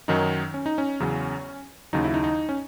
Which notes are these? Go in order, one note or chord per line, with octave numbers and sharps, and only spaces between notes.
F#2 D#3 F#3 D#4
C#4
D#4
C#4
E2 C#3 F#3
D#2 C#3 F#3 D#4
E4
D#4
D#4
C#4